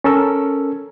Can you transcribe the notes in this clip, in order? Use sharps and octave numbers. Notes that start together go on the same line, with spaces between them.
C#4 A4 A#4 E6